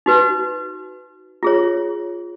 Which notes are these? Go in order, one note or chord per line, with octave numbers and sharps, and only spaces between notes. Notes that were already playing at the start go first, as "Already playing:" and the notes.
D#4 F#4 B4
F4 G#4 C#5